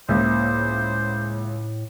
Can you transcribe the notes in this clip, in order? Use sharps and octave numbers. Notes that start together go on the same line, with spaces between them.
C#2 A2 A#3 C5 E5